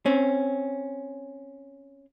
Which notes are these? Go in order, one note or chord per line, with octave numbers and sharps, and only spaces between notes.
C4 C#4